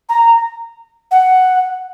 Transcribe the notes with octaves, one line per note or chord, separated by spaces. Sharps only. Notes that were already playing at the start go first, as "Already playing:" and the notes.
A#5
F#5